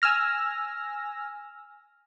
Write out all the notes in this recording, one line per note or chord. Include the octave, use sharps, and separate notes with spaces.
G#5 E6 F6 A#6